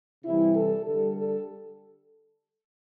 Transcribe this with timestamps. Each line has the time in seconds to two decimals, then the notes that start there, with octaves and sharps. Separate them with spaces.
0.25 C3 E3 G3 E4
0.56 A4
0.86 D3 G3 A4
1.17 A4